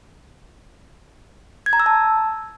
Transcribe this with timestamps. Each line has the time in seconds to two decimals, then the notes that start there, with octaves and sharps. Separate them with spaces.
1.66 G#6
1.73 A#5
1.80 E6
1.86 A5